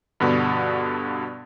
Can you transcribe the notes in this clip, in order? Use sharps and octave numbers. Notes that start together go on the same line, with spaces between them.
G2 B2 D3 B3